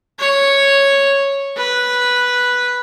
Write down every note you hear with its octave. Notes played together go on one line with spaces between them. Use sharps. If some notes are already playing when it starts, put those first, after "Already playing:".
C#5
B4